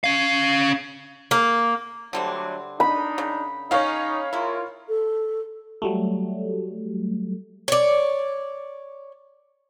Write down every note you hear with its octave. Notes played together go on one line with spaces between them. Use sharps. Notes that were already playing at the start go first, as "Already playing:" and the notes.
C#4 F5
A#3
D3 F#3 G3 A3 C4 D4
D4 D#4 B5
C#3
C#3 C#4 D#4 C#5 F5
G#3 E4 F4 A#4
A4
F#3 G3 A3
C#5 D5